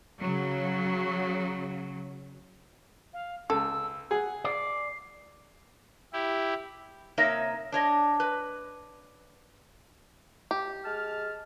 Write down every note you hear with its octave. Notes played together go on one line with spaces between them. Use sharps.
C#3 F#3
F5
C#2 A4 E6
G#4 F#5
D5 C7
E4 G4
C3 A#3 D#4 A#4 C#5 E5
D4 C#5 D#5
B4
G4
G#3 A5 F6